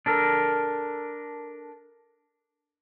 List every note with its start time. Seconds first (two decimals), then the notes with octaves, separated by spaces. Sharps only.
0.06 D4 A4 A#4